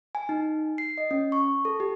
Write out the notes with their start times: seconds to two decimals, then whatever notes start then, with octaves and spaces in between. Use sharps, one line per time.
0.15 G#5
0.29 D#4
0.78 C7
0.98 D#5
1.11 C#4
1.32 C#6
1.65 A4
1.80 G4